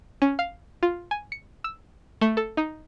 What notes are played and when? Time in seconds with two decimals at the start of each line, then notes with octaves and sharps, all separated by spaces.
0.22 C#4
0.39 F5
0.83 F4
1.11 G#5
1.32 C#7
1.64 E6
2.21 A3
2.37 A4
2.57 D#4